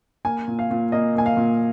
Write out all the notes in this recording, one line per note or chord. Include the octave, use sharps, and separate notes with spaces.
A#3 G#5
A#2
F5
A#2
A#3 D#5
A#3 G#5
F5
A#2